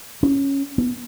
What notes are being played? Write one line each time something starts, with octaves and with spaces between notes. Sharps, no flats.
C#4
B3